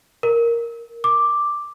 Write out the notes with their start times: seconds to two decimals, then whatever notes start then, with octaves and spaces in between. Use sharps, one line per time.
0.23 A#4
1.04 D6